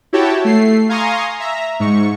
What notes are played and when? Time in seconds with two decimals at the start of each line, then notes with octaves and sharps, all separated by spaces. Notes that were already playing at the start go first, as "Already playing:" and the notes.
0.13 E4 F#4 G4 C#5 G5 A5
0.45 A3 C7
0.89 F5 G#5 A#5 C6 C#6 D#6
1.40 E5 A#5
1.80 G#2 C#6